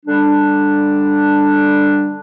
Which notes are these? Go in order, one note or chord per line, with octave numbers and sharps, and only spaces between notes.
D3 G3 D4